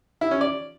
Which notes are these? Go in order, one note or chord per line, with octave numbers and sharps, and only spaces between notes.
E4
C#4
D5